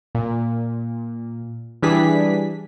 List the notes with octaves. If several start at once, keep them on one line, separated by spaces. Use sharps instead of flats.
A#2
E3 G3 D4 G#4 B6